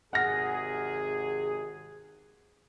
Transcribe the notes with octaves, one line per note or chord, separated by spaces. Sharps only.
G#1 C3 G#4 F#5 F6 A#6